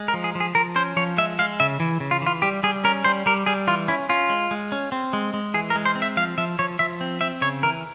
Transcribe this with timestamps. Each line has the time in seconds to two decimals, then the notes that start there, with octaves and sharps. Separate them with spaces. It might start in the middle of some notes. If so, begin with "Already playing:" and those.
Already playing: G#3
0.08 A#4
0.14 F3
0.24 G#4
0.35 F3
0.40 G#4
0.55 F3 A#4
0.76 C#4 C5
0.96 F3 C#5
1.17 G#3 E5
1.39 G#3 F5
1.60 C#3 E5
1.80 E3
2.00 C#3
2.11 F4
2.22 E3 F4
2.42 G3 G4
2.63 G3 G#4
2.84 C#4 A#4
3.04 G3 C5
3.26 G3 A#4
3.46 G3 G#4
3.67 E3 F4
3.88 C#4 E4
4.09 C#4 F4
4.30 G#3
4.51 G#3
4.72 C#4
4.92 C4
5.13 G#3
5.34 G#3
5.54 E3 G#4
5.70 A#4
5.76 G#3
5.86 C5
5.96 C4
6.02 E5
6.17 F3 F5
6.38 F3 E5
6.59 F3 C#5
6.79 F3 E5
7.01 C4
7.21 C4 E5
7.41 C#3 C#5
7.63 E3 A#4